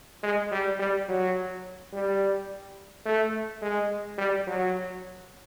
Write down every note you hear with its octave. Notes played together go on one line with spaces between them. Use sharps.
G#3
G3
G3
F#3
G3
A3
G#3
G3
F#3